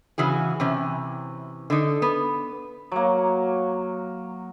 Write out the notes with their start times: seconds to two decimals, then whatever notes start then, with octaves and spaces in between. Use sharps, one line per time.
0.18 C#3 E3 F#4 G#4
0.60 C3 E3 C#4
1.70 D3 D#4
2.02 B3
2.92 F#3 A#3